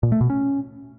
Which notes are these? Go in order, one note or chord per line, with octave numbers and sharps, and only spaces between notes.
A#2
A3
B2
C#4